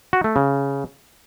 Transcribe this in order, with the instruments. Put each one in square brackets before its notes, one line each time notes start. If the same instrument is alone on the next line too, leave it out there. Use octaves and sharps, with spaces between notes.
[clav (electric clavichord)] F#4
A3
C#3